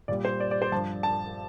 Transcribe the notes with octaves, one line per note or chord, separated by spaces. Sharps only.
A#2 G3 D5
C5
D5
D5
C5
G2 F3 A5
A5